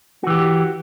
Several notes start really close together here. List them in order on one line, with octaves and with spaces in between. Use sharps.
F#4 E3 G4